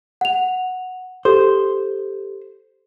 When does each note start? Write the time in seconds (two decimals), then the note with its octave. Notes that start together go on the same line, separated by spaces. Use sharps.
0.21 F#5 F7
1.25 G4 A4 C5